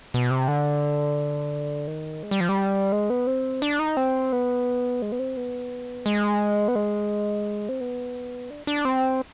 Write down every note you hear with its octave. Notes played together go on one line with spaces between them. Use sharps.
B2
C3
D3
D#3
G#3
G3
F3
G3
G#3
B3
C4
D4
D#4
C4
B3
G#3
B3
C4
B3
G#3
B3
G#3
C4
B3
D4
D4
C4